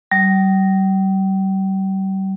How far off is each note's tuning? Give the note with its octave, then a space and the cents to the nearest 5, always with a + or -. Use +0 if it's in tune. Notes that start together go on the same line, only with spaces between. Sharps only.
G3 -35